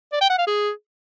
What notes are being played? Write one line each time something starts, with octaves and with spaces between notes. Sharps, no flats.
D5
G5
F#5
F5
G#4